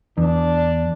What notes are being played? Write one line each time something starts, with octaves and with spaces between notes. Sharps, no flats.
E2 D4